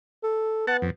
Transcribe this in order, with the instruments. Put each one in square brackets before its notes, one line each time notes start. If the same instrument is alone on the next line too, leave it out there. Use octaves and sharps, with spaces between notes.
[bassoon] A4
[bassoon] B3 [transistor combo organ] F#5 A5
[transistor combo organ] F2